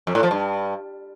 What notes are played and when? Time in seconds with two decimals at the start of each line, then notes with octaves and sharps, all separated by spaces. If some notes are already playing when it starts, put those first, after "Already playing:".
0.07 F2
0.15 A2
0.23 F3
0.31 G2